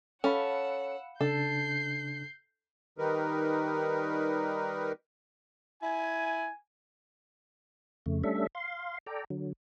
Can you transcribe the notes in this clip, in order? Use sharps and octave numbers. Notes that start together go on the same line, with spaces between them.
C#4 A4 F5 F#5 B5 E6
C#3 D4 A4 G6 C7
D#3 G3 D#4 A#4 B4
E4 G#5
F2 C#3 A3
G3 A3 C#4 D4 A4 E5
F5 C6
A4 D5 G5 A#5
D3 F#3